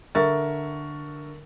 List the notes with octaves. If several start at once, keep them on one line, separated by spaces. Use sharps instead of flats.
D3 A#4 E5 C#6 A6